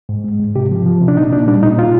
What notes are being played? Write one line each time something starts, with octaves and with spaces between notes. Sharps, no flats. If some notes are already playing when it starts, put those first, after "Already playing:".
G#2
G#3
G#2
C3 G4
F3
F3
C3
D4
A#2 D#4
A#2 D4
G3 D4
A#2 D#4
A#2 F4